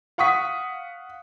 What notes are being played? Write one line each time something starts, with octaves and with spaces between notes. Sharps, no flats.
F5 F#5 C#6 D#6 B6